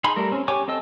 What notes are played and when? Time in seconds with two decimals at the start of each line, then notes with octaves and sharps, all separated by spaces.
0.04 D#4 G#4 B5 C6
0.16 G3 A3 A#4
0.31 C4 C#4
0.48 G4 C#5 G#5 C#6 D6
0.68 C4 A4 D#5 E6